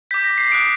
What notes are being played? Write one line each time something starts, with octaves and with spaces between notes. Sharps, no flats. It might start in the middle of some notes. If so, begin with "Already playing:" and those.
D6 G6 B6
A#6
C7
D#6 F#6 D7